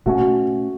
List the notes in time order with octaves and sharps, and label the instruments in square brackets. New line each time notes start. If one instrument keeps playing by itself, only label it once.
[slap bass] B2 A3 C#4 [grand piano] F#4